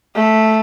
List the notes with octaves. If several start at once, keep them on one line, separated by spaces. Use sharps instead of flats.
A3